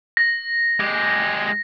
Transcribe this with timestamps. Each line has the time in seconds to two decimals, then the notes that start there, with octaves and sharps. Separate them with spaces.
0.17 A#6
0.80 G#3 G4